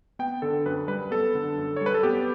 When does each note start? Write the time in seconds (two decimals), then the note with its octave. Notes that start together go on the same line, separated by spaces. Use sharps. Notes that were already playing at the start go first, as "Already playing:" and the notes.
0.19 B3 G5
0.42 D3 A4
0.66 F#2 B4
0.88 G3 B4
1.11 B3 A4
1.35 D3
1.58 F#2
1.76 C#5
1.81 G3
1.86 B4
1.94 A4
2.03 B3 G4